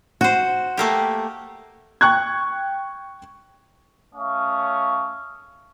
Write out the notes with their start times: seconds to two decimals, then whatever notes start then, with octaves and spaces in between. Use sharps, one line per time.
0.21 F#4 C5 F#5
0.77 A3 A#3 G4
2.01 G5 C#6 F#6 G#6
4.15 A3 C#4 F5 C#6 D#6